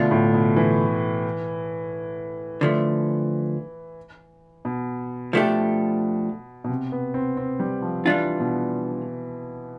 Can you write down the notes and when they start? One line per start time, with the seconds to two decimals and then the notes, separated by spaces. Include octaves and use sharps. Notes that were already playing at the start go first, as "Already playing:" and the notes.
Already playing: B2 D3 A3 D4 F4
0.11 A2
0.34 B2
0.56 E3
2.61 D3 F3 A3
4.65 B2
5.33 F3 A3 D4 G4
6.64 B2
6.69 C3
6.92 B3
7.14 C4
7.37 C4
7.60 G3
7.82 F3
8.05 E3 G3 D4 F4
8.40 B2